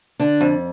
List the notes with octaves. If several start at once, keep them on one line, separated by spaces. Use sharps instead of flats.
D3 D4
F2